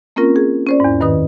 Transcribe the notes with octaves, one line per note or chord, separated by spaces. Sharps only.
A#3 C4 C#4 F4 A#4
G#4
C#4 C5 D5
E2 G#2
G2 D#3 B4 D#6